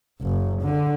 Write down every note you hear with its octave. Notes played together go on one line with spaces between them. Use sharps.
F#1
D3